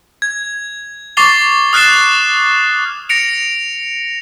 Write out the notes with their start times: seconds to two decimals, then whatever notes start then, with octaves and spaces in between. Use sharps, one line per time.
0.22 G#6
1.17 C#6 D6 A6 C7 F7 G7
1.73 D#6 F6 F#6 A6 C7 E7
3.09 A#6 C#7 D7 F7